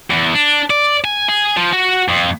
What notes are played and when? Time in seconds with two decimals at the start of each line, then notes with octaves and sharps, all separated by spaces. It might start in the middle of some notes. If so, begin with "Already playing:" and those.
0.11 E2
0.34 D4
0.70 D5
1.04 G#5
1.29 G#4
1.57 F3
1.73 F#4
2.09 F2